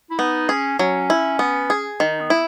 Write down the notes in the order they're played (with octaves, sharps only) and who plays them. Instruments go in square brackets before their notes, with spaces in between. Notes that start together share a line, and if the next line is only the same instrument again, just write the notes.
[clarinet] E4
[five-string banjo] B3 [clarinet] D#4
[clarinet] C#4 [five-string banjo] G#4
[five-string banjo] F#3 [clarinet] C#4
[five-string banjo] E4
B3
G#4
[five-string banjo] D#3 [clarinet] D#4
[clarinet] B3
[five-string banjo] E4